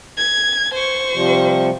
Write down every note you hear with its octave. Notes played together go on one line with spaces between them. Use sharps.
G#6
C5 C#6
C3 F3 G3